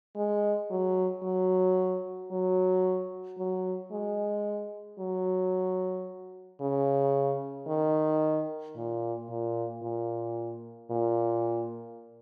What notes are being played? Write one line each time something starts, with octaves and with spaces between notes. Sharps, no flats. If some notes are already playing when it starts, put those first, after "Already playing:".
G#3
F#3
F#3
F#3
F#3
G#3
F#3
C#3
D#3
A#2
A#2
A#2
A#2